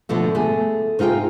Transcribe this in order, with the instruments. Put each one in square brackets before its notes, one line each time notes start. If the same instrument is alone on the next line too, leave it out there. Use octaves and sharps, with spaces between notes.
[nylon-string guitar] B2 D3 F3 A3
A3 G#4
C3 D#4 F4 G#4 G5